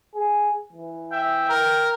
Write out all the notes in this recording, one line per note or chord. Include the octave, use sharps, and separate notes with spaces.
G#4
E3
E5 G5
A#4